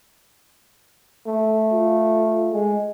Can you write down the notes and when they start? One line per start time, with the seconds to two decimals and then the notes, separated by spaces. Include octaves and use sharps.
1.27 A3
1.73 F4
2.53 G#3